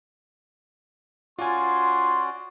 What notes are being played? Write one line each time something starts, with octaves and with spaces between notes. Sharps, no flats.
C#4 F4 F#4 D5 G#5 C6